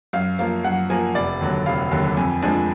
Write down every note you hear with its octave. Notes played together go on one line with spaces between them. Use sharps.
F#2 F5
F3 A#3 F5
F#2 F#5
F3 A#3 G#5
F1 D5
D#2 D3 F#3
F1 F5
D#2 D3 F#3
F2 G#5
F3 G#3 D4 G#5